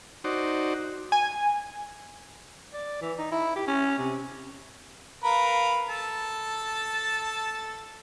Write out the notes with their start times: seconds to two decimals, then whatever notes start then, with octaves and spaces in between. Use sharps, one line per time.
0.24 D#4 F#4 C5 D5
1.12 G#5
2.73 D5
3.02 E3
3.19 D#4
3.32 E4
3.56 G4
3.68 C#4
3.99 C3
5.23 A#4 B4 F5
5.89 A4 A5